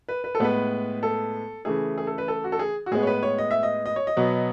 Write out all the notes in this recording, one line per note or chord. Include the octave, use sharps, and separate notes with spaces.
B4
B4
A4
A2 G#3 B3 B4
A4
C#3 E3 A3 G#4
G#4
A4
B4
A4
F#4
A4
G#4
F#4
A2 G#3 B3 G#4
C#5
B4
C#5
D#5
E5
D#5
D#5
C#5
D#5
B2 F#3 B3